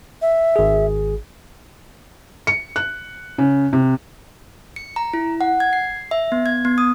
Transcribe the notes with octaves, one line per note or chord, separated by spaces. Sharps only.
E5
G#1 G#4
C#7
F#6
C#3
C3
C#7
A#5
E4
F#5
G#6
C7
E5
B3
G#6
B3
D#6